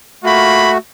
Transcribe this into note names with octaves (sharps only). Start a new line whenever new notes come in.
A3 A#3 F4 F#4 B5